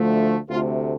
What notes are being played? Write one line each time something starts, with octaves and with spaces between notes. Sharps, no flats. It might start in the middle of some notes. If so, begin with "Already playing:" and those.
Already playing: D2 D3 F3 A3
D2 C3 A3 F4